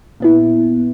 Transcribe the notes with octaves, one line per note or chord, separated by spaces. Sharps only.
A#2 B3 E4